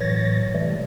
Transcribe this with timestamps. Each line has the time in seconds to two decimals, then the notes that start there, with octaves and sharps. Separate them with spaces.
0.01 A2 E3 F#3 C#5 A6 A#6
0.54 C3 E3 G3 A3